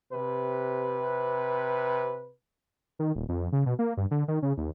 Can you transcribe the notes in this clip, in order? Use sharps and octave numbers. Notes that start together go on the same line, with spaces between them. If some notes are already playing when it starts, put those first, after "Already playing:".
C3 B4
D#3
D#1
F2
C#3
B2
A#3
G2
D3
D#3
C#3
D#2